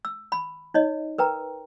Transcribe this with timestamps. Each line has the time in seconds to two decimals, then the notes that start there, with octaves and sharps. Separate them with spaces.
0.05 E6
0.32 B5
0.74 D#4 C#5 D#5
1.18 A#4 B4 G5 A#5